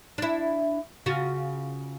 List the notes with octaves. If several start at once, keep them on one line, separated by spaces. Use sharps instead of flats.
D4 E4
C#3 F4 F#4